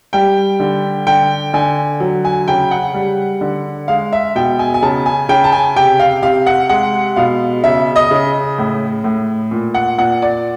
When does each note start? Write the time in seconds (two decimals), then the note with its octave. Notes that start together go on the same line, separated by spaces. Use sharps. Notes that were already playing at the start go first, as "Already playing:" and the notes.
0.13 G3 G5
0.60 D3
1.07 D3 G5
1.54 D3 G#5
2.00 F#3
2.25 G#5
2.48 C#3 G5
2.71 F#5
2.94 G3
3.41 D3
3.88 G#3 F5
4.13 E5
4.35 B2 G5
4.59 G#5
4.74 G#5
4.82 C#3 A5
5.06 G#5
5.29 C#3 G5
5.44 A5
5.52 G#5
5.76 C3 G5
5.99 F5
6.23 C3 F5
6.47 F#5
6.69 G#3 F#5
7.16 B2 F5
7.64 C#3 E5
7.96 D#5
8.11 C#3
8.58 A2
9.04 A2
9.51 A#2
9.74 F#5
9.98 A#2 F#5
10.22 D5